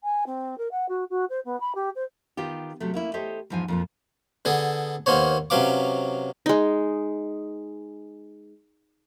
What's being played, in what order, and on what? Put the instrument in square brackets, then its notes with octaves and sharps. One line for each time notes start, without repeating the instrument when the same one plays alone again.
[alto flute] G#5
C4
A#4
F#5
F#4
F#4
C5
B3
B5
G4
C5
[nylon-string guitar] D#3 B3 F4 G4
C3 F#3 A3
A#3 C#4 E4
G4 A4 C5 C#5 D#5
E2 G#2 F3 C5 G#5
F2 A#2 F3
[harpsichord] D3 B3 G#4 A4
D#2 A#3 B3 C5 C#5
C3 F#3 C#4 B4 F5 D6
[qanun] G#3 D#4